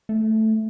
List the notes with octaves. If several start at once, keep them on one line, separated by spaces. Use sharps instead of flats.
A3